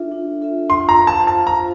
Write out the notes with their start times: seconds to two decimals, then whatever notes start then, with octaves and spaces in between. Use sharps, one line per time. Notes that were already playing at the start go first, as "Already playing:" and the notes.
Already playing: D4 F4 A4 E5
0.12 D4
0.41 F4 A4 E5
0.69 F4 C6
0.89 A#5
0.99 C5 F5
1.07 A5
1.27 F4 A5
1.47 A#5
1.55 C5